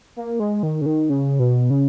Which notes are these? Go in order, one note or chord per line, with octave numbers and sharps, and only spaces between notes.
A#3
G#3
D#3
C#3
D#3
C#3
B2
C#3